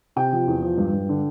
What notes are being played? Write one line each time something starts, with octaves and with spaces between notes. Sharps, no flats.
C3 G5
F3
E2
F3
G2
G2
D3